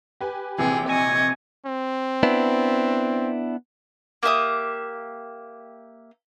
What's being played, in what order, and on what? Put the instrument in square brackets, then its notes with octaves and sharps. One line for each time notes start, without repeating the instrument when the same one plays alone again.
[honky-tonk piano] G4 B4 G#5
[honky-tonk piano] A#1 C3 E3 [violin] G#4 G5
[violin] D#5 C#6 [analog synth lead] G#5
[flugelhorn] C4
[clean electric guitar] B3 D4 E4
[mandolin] A#3 G4 E5 D#6